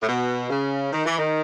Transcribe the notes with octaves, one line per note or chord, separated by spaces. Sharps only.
A2
B2
C#3
D#3
E3
D#3